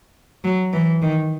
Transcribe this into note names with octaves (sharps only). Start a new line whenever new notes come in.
F#3
E3
D#3